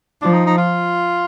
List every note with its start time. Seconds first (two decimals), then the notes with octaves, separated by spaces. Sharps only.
0.22 F3 D4
0.33 D#4
0.46 D#4
0.57 F4